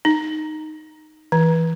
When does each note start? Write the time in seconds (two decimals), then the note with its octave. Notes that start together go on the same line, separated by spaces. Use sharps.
0.05 D#4
1.32 E3